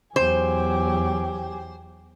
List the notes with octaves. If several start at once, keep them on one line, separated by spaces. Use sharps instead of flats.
E2 F#3 G4 C5 G#5